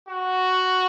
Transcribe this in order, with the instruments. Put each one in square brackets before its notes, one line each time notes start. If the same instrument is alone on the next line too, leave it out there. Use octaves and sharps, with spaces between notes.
[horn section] F#4